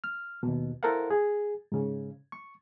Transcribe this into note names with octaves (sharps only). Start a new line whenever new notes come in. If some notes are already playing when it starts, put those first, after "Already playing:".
F6
D#2 B2
E4 A4 A#4 C5 F5 F#5
G#4
G#2 C#3
C#6